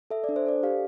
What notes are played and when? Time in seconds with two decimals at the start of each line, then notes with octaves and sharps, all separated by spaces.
0.10 A4 E5
0.24 D4 D5
0.36 C5
0.46 A4 D5
0.63 G4 F5